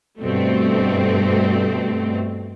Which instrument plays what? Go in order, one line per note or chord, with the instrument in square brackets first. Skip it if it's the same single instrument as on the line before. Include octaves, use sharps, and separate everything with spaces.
[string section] G2 B2 A3 C4